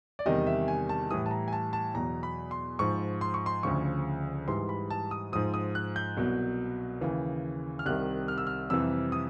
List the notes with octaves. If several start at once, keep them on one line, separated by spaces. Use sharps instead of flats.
D5
E2 C3 D#3 G3 D#5
E5
G#5
A5
A2 E3 G3 D#6
A5
A#5
G#5
A5
A5
E2 B2 F#3 A#5
B5
C6
G#2 F3 C#6
C6
C#6
C6
D2 C#3 F3 C#6
G#2 E3 G3 C6
B5
A5
D#6
G#2 F3 D#6
D#6
F#6
G6
C2 B2 F#3
D#2 C#3 E3
F6
C2 C3 D#3 G3 F#6
F6
E6
F6
F2 C3 E3 G3 E6
D#6